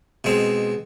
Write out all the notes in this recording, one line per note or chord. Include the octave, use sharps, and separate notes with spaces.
B2 G#3 C4